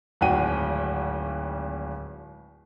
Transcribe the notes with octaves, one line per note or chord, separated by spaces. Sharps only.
D1 G#1 F#4 F#5 G5 D#7